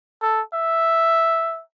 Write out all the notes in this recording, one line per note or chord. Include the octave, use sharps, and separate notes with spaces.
A4
E5